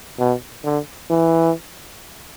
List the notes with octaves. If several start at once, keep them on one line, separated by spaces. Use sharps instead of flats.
B2
D3
E3